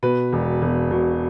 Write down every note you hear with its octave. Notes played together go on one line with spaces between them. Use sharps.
B2 B4
E1
E1
B2